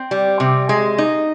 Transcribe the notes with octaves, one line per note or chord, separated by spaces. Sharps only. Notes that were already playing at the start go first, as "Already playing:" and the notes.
Already playing: C4 G5
G3
C3
G#3
D#4